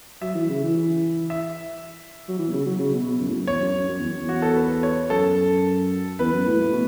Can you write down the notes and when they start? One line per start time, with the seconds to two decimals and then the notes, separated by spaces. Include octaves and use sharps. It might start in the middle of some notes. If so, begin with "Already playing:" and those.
0.22 F#3 E5
0.35 E3
0.49 C#3
0.63 E3
0.77 E3
1.30 E5
2.28 F#3
2.39 E3
2.48 B2
2.53 C#3
2.66 F#3
2.79 C#3
2.94 B2
3.20 F#2
3.29 A2
3.35 F#2
3.47 E2 C#5
3.61 F#2
3.74 F#2
3.89 F#2
3.99 E2
4.19 E2
4.29 F#4
4.42 A4
4.56 B4
4.83 C#5
5.10 F#2 A4
6.19 E2 B4
6.33 F#2
6.46 A2
6.60 A2
6.73 B2